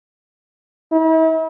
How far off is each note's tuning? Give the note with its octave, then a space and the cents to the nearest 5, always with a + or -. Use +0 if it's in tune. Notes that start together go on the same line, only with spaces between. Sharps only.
E4 -45